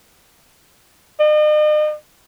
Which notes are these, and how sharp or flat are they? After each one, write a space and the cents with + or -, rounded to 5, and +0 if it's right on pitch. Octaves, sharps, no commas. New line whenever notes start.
D#5 -40